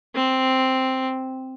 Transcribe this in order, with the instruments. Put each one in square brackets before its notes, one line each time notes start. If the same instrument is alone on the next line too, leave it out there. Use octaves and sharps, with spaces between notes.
[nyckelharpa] C4